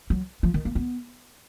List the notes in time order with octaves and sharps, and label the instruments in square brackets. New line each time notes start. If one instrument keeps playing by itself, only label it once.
[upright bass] F#3
F3
D#3
A#3
B3